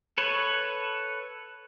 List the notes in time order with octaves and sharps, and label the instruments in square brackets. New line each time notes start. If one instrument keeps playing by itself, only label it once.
[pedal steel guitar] A4 B4 C#5